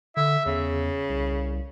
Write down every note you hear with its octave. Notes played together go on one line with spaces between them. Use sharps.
D3 E5
E2 C#3
C2